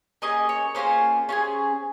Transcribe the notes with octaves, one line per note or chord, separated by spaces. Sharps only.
A#3 C#4 G#4 D#5
C#5
A#3 C#4 F4 G#4 C5
C#4 F4 G#4